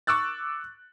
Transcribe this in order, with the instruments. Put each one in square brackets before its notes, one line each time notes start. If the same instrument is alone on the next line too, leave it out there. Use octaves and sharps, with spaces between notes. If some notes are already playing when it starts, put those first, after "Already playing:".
[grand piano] C#6 D6 E6 F#6 A6